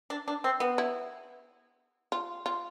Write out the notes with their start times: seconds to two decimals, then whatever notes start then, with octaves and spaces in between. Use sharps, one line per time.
0.10 D4
0.28 D4
0.44 C4
0.60 B3
0.78 E4
2.12 F4
2.46 F4